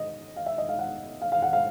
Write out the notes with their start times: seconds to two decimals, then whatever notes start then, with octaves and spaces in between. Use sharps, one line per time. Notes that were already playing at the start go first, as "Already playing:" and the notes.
Already playing: D#5
0.36 F5
0.46 E5
0.58 D#5
0.69 F5
0.79 F#5
1.21 F5
1.32 F5
1.42 F#5
1.53 F5